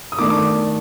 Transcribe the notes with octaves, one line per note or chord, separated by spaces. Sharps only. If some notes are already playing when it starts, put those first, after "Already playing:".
D#6
D#3 A3 D4 D6
D6